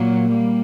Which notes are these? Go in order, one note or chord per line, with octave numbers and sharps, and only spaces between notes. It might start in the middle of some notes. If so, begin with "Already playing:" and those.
Already playing: A#2 F#3 A#3
G3 A#3